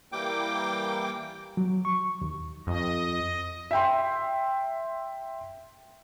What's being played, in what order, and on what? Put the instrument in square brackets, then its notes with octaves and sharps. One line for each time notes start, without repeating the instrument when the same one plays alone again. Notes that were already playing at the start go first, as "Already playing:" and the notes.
[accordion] E3 G3 A#3 G5 D6
[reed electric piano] F#3
C#6
D#2
[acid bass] F2 [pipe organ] D#5
[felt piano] E5 G5 C6